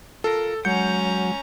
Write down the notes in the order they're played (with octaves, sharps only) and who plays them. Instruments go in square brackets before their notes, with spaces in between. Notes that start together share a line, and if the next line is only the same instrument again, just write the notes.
[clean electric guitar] F4 A#4 [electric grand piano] A4
[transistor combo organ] F#3 [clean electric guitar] G#3 F#5 [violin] C#4 A#5 [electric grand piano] G6